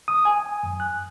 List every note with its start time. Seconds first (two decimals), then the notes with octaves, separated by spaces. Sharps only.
0.08 D#6
0.25 G#5
0.63 F#2
0.80 F#6